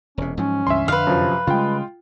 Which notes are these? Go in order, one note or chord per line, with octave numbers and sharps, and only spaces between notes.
E1 C3 C#4
G#2 F3 F#3 C#4
C#2 G2 E3 E5 C6
F2 D3 D4 B4 F5
F#2 C3 F3
C#3 G3 G#3 F4 G5